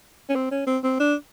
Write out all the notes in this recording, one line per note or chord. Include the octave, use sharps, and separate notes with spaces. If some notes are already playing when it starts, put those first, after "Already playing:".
C#4
C4
C#4
C4
C4
D4